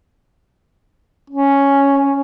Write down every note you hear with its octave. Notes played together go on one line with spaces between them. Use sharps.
C#4